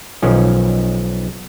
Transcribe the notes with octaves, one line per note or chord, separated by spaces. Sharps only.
B1 D#3 F3 C#4